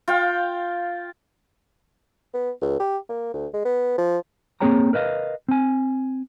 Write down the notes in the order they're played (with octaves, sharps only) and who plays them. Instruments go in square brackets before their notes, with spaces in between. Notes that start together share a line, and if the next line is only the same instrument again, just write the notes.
[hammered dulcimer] F4 F5 G5
[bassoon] B3
C#2
G4
A#3
D2
G#3
B3
F3
[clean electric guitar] A#3 C4 G#4 C#5 G5 A#5
A#4 B4 D#5 F5
C4 G#5